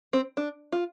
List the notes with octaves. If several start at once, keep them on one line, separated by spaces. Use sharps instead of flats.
C4
D4
F4